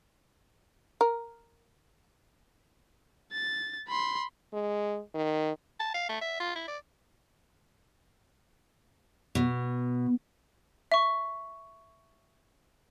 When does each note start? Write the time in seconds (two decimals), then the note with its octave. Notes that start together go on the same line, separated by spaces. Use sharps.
1.01 A#4
3.32 A6
3.88 B5 C6
4.53 G#3
5.14 D#3
5.80 A5
5.94 F5
6.09 A3
6.21 E5
6.40 F4
6.56 E4
6.68 D5
9.35 B2
10.92 E5 C#6